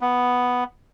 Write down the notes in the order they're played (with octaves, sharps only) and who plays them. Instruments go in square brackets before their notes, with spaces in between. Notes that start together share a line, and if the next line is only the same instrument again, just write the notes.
[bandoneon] B3